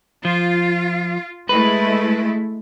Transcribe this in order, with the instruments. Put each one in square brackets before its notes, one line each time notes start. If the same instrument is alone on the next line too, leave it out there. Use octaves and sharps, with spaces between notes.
[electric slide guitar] F3 [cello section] F4
[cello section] G#3 A3 E4 [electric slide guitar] B4